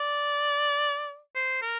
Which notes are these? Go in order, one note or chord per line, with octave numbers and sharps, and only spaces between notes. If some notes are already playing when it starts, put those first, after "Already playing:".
Already playing: D5
C5
A#4